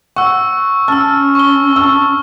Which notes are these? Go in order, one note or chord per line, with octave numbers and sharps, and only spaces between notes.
F#5 C#6 E6
C#4 A5 E6 F6
C#6 G7
A5 E6